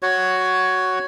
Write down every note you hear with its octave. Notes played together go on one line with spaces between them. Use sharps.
F#4 C#5